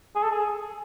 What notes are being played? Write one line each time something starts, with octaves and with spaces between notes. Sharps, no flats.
G#4
A4
G#4